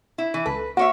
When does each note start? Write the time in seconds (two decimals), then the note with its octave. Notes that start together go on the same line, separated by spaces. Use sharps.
0.18 E4
0.34 E3
0.46 C#2 A4 B4
0.77 A#3 F#4 C#5 E5